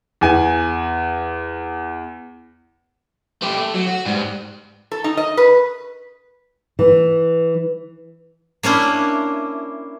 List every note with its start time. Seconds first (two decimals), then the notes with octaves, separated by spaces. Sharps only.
0.21 E2 G#5
3.42 A3 G4
3.57 A3
3.74 F#3
3.87 F#4
4.05 G#2 G3
4.92 A4
5.04 D#4
5.17 D#5
5.37 B4
6.79 E3
8.63 A#3 C#4 D4 E4